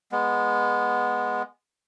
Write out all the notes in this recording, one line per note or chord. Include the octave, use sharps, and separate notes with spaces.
G#3 B3